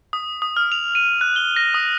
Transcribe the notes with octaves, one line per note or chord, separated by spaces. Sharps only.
D#6
D#6
F6
F7
D#7
F#6
G7
A#6
D#6